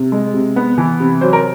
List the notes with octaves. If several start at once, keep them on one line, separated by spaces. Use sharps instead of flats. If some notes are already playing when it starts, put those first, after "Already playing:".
Already playing: C3
G#3
C3
B3
E3
C3
F#3 C5
A#4